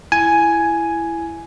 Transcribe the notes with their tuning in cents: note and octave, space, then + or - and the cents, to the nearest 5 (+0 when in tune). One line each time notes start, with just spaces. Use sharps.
E4 +15 G#5 +5